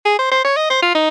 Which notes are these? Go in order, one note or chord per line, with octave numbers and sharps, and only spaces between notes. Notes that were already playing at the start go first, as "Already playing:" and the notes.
G#4
C5
C5
C#5
D#5
C5
F4
D#4